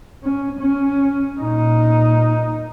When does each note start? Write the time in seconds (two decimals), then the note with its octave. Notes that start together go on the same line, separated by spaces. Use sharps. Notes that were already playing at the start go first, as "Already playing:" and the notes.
0.23 C#4
0.60 C#4
1.39 A#2 D#4